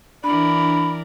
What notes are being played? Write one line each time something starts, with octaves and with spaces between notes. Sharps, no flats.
E3 D4 A#4 D5 B5